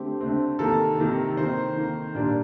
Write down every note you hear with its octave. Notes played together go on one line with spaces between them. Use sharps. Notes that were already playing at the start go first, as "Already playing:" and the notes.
Already playing: D3 A3 C4 G4
D3 A3 C4
C3 D#3 A#3 A4
C3 D#3 A#3
D#3 A#3 C4 C5
D#3 A#3
A#2 G3 A#3 D4 D5